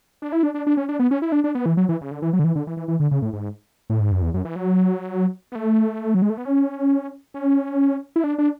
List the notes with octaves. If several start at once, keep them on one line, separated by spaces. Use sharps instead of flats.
D4
E4
D4
D4
D4
C#4
D4
B3
C#4
E4
D4
D4
B3
E3
F#3
E3
C#3
D3
E3
F#3
D3
E3
D3
E3
E3
E3
D3
C#3
A2
G#2
A2
G#2
F#2
E2
F#2
E3
F#3
B3
A3
F#3
G#3
A3
B3
C#4
C#4
E4
D4
D4